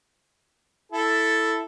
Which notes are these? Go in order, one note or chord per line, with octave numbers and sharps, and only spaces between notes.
E4 A4